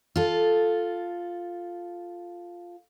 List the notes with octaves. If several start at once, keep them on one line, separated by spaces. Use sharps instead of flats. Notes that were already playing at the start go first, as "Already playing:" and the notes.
F4 A4